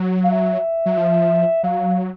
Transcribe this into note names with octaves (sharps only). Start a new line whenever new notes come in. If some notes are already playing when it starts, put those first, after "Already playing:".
Already playing: F#3
F5
E5
F#3
F3
F#3 F5